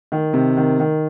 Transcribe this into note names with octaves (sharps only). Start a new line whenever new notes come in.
D#3
C3
D#3
D#3